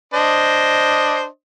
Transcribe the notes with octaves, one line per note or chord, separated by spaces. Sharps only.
D4 C5 D#5